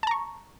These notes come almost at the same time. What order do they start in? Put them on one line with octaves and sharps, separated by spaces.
A5 A#5 C#6